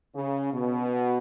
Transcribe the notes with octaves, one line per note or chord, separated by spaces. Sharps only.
C#3
B2